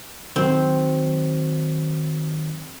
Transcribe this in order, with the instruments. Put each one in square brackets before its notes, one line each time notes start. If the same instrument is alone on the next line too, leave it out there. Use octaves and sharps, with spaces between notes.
[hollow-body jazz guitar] D#3 F#3 [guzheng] C4